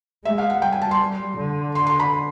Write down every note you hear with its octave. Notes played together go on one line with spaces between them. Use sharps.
G#3 E5
F5
F#5
G3 G5
G#5
A5
C6
D3
C6
C6
B5